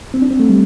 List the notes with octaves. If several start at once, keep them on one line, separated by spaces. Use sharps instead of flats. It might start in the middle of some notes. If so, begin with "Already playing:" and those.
C4
D4
C4
A3
G3